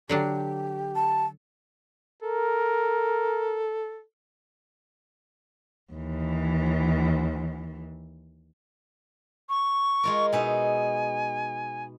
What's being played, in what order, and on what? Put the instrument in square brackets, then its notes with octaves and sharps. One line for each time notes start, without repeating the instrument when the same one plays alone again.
[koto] D3 F#3 D4 [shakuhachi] G4
[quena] A5
[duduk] A4 [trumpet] A#4
[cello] D#2 E3
[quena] C#6
[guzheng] G#3 F4 A#4
[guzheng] B2 D#4 E5 [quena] G#5